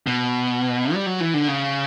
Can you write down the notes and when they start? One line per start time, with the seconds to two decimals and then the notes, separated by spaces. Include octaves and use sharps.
0.07 B2
0.93 G3
1.06 F#3
1.21 E3
1.34 D3
1.48 C#3